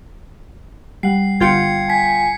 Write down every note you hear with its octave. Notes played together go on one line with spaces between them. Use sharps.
G3 F#5 C7
G1 F4 G5 G#6 C7 C#7
G#5 B6